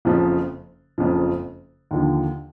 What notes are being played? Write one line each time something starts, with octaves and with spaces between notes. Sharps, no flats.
F#1 F2 C#3 F3
F#1 F2 C#3 F3
D#2 D3 F3